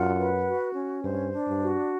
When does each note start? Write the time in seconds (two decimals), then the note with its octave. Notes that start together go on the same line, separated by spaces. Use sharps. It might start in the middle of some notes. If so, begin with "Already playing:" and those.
Already playing: F#2 F4 F#5
0.18 B4
0.48 F#4
0.76 C#4
1.04 G2 C5
1.33 D4
1.47 G2
1.62 F#4